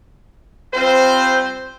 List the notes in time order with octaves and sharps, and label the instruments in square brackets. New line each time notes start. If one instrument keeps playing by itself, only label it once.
[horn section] G3 C4 F4 C5